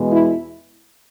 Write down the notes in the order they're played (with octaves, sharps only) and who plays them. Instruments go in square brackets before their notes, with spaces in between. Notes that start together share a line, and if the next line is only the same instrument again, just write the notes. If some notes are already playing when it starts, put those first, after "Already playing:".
Already playing: [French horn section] E2 B2 G#3
E4